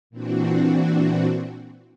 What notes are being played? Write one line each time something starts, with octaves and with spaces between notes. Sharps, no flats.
A#2 E3 C4 D4 F#4